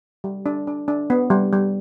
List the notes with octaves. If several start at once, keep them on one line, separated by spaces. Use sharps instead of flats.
G3
D4
D4
D4
B3
G3
G3